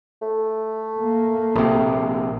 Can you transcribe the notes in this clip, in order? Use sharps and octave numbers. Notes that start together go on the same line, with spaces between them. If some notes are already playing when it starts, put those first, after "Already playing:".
A3
A#3
A#1 C3